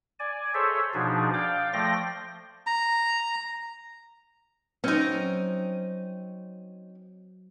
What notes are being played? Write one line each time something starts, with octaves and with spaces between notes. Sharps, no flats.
D5 G#5
G#4 A4 C5 C#5 E5
B2 F3 D4 D#4 G#4
D5 F5 G5 D6
F3 A3 D5 G5 C6 A#6
A#5
F#3 C4 C#4 D#4